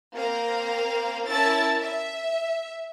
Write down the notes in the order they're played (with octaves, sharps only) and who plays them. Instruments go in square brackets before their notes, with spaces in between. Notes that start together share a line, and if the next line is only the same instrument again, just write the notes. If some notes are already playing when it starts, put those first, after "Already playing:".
[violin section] A#3 C4 C5 F5 A#5
C#4 E4 A#4 A5 E6 A6
E5